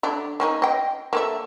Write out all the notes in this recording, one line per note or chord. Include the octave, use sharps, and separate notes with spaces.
D3 D4
A#3 C#4 D#4
D#5 G5
A#3 A4 E5